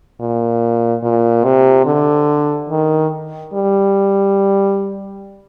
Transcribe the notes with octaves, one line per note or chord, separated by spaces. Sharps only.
A#2
A#2
C3
D3
D#3
G3